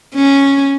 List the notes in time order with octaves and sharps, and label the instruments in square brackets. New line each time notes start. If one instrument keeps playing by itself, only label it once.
[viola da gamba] C#4